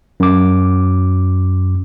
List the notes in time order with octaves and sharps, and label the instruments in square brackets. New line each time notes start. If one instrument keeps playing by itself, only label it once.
[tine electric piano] F#2 D6